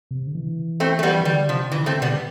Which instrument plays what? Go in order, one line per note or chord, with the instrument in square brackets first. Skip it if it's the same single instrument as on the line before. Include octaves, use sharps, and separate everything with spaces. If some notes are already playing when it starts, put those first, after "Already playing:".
[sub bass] C3
D3
E3
[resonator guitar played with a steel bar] A3 C4
A3
G3 B3
[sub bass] E3
[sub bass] D3 [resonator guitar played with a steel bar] G3
[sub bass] C3 [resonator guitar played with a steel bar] F3
[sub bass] D3 [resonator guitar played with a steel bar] E3
[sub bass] D3 [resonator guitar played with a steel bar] A3 C4
[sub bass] B2 [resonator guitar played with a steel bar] G3 B3